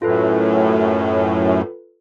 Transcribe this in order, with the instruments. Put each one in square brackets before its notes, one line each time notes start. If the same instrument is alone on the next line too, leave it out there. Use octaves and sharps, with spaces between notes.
[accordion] F#2 A2 [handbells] F4 A4 B4